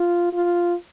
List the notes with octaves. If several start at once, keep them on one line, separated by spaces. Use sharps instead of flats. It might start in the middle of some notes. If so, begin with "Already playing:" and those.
Already playing: F4
F4